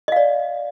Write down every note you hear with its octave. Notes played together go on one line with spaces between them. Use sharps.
D5 D#5 F5